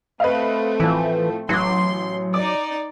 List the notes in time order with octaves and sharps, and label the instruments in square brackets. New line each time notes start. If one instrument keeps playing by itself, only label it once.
[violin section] A3 C4 [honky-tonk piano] B4 D#5 F5
[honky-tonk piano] A2 F3 [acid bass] E3
[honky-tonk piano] A1 D6 [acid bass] F#3 [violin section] C6
[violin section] D#4 D5 [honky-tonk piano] D6